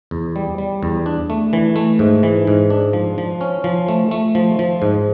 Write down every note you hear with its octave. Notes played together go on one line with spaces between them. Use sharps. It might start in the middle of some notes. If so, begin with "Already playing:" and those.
E2
G3
G3
E2
D4
A3
E3
A3
G#2
E3
G#2
D4
F3
F3
C#4
F3
A3
A3
F3
F3
G#2